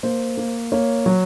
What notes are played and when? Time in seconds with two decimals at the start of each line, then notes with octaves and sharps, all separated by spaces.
0.03 A#3 C5
0.37 A#3
0.72 A#3 C#5
1.06 F#3